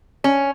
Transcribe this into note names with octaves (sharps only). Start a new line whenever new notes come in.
C#4